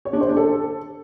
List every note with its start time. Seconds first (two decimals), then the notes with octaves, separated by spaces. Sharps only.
0.05 C#5
0.13 D4
0.21 C5
0.29 D4
0.37 A4